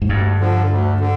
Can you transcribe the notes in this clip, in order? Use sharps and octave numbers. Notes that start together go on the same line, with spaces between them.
G#2
D2 G2
D3 F3
D2
D3